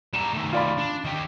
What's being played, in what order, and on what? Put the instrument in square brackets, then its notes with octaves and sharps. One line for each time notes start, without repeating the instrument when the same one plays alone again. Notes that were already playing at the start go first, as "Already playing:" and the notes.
[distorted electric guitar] G3 A#5 [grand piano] E7
[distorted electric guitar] D#3 A3
[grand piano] F4 D5 B5
[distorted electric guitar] D4
D#3 G4